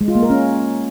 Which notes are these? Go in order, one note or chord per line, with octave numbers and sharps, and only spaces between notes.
G#3
F4
A#3
A#4
C#4